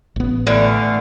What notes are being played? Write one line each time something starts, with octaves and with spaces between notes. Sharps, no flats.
A1 B3
A2 D3 E3 A3 F5